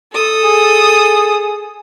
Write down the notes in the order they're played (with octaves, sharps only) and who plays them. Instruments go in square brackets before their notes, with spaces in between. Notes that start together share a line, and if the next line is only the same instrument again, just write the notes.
[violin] A4 D#6
[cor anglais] G#4